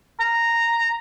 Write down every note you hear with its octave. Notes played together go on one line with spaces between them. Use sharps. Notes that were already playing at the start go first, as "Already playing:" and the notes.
A#5